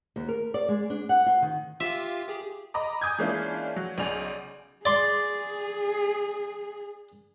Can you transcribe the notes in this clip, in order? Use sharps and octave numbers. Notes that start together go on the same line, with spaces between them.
D#2
A#4
D5
G#3
D4
F#5
F4
D#3
F4 G4 E5 F5
G4 G#4
D#5 A#5 B5 D6
G#5 D6 D#6 G6 G#6
E3 G#3 A#3 C#4 D4 F4
F#3
B1 C#3 D5 G#5 F7
G#4 D5 C6